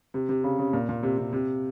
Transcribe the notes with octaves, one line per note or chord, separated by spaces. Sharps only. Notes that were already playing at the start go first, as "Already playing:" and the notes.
C3
C3
C#3
C#3
A#2
A#2
C3
C3
C3